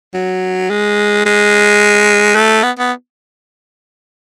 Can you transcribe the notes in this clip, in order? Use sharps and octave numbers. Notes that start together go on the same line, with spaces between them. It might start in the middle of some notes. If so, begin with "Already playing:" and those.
F#3
G#3
G#3
A3
B3
B3